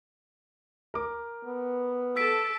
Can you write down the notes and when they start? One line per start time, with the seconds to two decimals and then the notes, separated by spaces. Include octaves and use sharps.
0.94 A#4 D6
1.45 B3
2.16 A4 A5 E6 B6 D7